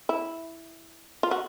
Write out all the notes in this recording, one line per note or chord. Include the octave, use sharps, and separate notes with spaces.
E4
F4
F#4